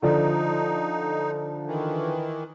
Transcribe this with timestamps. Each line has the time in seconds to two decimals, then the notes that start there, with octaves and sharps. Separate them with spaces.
0.02 D3 F3 D#4 D5
1.66 D#3 E3